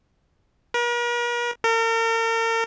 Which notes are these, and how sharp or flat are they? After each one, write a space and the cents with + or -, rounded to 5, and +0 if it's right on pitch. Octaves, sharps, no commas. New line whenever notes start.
A#4 +45
A#4 -40